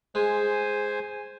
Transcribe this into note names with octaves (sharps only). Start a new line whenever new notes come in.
G#3 C5 G#5